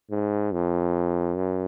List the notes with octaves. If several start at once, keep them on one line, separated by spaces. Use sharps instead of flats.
G#2
F2
F#2